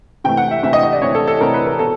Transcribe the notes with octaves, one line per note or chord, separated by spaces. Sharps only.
C3 E3 A3 G5
F#5
E5
C3 E3 A3 E5
D#5
D#5
D5
C3 E3 A3 C#5
A4
A4
C3 E3 A3 A#4
B4
A#4
B2 A4